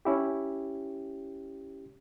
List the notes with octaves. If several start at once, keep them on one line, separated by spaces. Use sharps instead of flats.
C#4 E4 G4